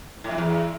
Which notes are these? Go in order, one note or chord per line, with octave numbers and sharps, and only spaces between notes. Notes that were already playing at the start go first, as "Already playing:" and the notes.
A2
F2
E2